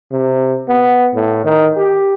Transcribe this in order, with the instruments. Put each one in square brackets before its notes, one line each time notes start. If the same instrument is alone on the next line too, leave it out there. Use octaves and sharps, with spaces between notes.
[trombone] C3
B3
A2
D#3
G4